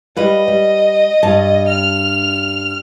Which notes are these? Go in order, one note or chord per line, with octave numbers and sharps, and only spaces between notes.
G3 B4 D#5 F5
G3
G2 A5
F6 F7